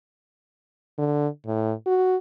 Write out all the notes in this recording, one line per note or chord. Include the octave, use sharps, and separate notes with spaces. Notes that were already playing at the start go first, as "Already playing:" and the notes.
D3
A2
F#4